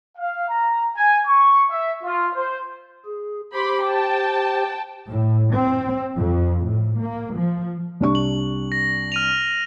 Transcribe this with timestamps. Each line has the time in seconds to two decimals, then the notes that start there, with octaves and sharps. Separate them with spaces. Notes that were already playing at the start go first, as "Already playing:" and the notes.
0.17 F5
0.49 A#5
0.96 G#5
1.27 C#6
1.70 E5
2.03 F4
2.33 C5
3.05 G#4
3.54 G4 C5 B5 C6 D6
3.85 G5 A5
5.08 A2
5.54 C4
6.16 F2
6.65 A2
7.01 A#3
7.36 F3
8.00 C2 D4 C#6
8.15 F#7
8.72 A#6
9.12 F6 D#7 F7